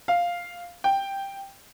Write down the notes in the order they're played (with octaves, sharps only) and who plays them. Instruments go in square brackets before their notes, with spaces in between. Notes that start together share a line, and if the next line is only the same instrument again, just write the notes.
[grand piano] F5
G5